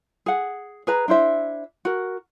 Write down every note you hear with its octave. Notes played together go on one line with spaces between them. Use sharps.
G#4 F#5
G#4 B4 A#5
D4 E4 C5 E5
F#4 A#4